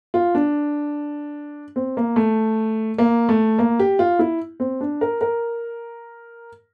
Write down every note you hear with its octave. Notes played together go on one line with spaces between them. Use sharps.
F4
D4
C4
A#3
A3
A#3
A3
A#3
G4
F4
E4
C4
D4
A#4
A#4